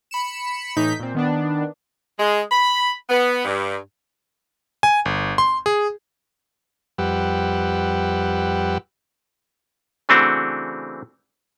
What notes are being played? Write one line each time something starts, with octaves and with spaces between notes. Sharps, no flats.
B5 C#7 E7
A2 E3 D#4 G6 B6
A#2 C4
D#3 B3 D4
G#3
B5
B3
G2
G#5
G1
C6
G#4
F2 G3 G4 B4 F#5 E6
C#3 E3 A3 C4 D4 F#4